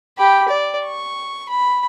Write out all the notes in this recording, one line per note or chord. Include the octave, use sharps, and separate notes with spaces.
G4 B5
D5
C#6
B5